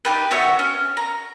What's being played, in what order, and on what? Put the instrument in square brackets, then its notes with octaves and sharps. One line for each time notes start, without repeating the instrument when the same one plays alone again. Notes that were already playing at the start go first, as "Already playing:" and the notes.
[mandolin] D#4 G4 B4
B3 F#4 C#5 E5
C#4
A#5